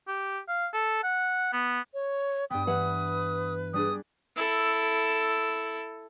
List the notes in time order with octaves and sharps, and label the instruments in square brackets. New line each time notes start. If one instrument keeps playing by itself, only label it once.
[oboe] G4
F5
A4
F#5
B3
[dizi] C#5
[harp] G2 B3 [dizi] G5 [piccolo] D#6
[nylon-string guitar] E3 F#5 [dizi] B4
[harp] G3 D4 G#4 [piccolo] D#6
[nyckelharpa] E4 A4